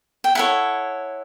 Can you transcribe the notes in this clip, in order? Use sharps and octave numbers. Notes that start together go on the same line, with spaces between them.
G5
E4 A4 C#5 F#5